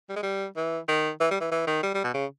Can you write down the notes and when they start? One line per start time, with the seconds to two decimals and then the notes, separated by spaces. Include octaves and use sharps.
0.09 G3
0.16 G#3
0.23 G3
0.57 E3
0.88 D#3
1.20 E3
1.31 G3
1.41 E3
1.52 E3
1.67 D#3
1.83 G3
1.94 G3
2.04 B2
2.14 C#3